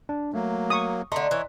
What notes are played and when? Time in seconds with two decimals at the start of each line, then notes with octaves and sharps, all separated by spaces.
0.09 D4
0.34 F#3 A3 A#3
0.70 C#6 D#6
1.12 D3 A3 D#5 A#5 C6
1.31 E3 C#5